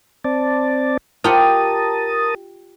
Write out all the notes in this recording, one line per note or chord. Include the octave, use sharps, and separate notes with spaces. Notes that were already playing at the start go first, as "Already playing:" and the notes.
C4 D5 A5
F4 G4 A#4 F#5 A5 D#6